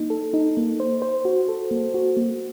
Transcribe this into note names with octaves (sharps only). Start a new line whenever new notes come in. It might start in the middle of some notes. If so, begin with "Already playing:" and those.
Already playing: A#3 D#4
A4
D#4
A#3
C5
C5
F#4
A4
A#3
F#4
A#3